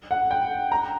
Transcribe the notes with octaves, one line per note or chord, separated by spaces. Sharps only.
F#5
G5
A#5